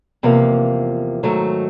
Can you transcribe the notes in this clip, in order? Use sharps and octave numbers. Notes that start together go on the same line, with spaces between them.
E2 C3 F3 A#3
G#2 D#3 F#3 A3